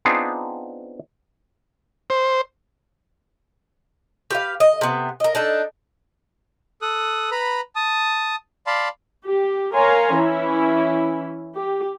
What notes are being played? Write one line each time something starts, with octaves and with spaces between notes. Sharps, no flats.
B3 C4 D4 D#4 F4 G#4
C5
G4 B4 F5
D#5
C3 B3
A#4 D#5
D4 D#4 A4
A4 D#6 F#6
B4 A#5 B5
A5 D#6
D5 F5 A5 B5 C6
G4
A#4 C#5 F5 G#5 A#5 C6
E3 C#4 E4
G4